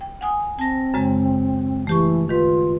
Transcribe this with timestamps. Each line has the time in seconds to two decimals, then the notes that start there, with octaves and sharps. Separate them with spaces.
0.01 G5
0.21 F#5 G#5 D#6
0.59 C4 A5 A#6
0.94 F#2 C#3 G#3
1.87 E3 A3 G4 C#6
2.29 D#3 F4 B4